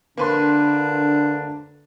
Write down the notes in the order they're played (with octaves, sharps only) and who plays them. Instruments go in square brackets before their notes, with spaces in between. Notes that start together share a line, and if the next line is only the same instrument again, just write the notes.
[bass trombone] D3 [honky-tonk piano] A#3 B4 C6 [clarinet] D4